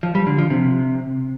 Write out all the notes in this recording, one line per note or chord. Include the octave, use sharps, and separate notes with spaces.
F3
G3
D3
F3
C3